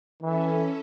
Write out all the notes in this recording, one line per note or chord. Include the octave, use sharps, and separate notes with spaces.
E3 C#4 A4 E5